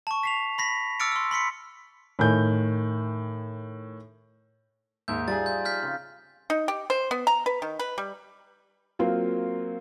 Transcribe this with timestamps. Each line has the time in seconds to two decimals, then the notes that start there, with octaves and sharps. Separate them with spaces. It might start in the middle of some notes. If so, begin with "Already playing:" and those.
0.07 A5 C#6
0.23 B6 C7 F7
0.58 B5 A#6 B6
1.00 D6 E6 F6 A6 C#7 D7
1.12 C6 E6
1.31 B5 C6 B6 C#7
2.19 A2 D#3 G#5 G6
5.08 D#2 G#2 D#4 E5 G6
5.28 F3 G3 D#4 G#4 A6
5.46 G6
5.65 F6 G6 B6
5.83 C#3 C4
6.50 D#4
6.68 G4
6.90 C5
7.11 B3
7.27 A#5
7.46 B4
7.62 D#3
7.79 B4
7.98 G3
8.99 F#3 A#3 C4 F4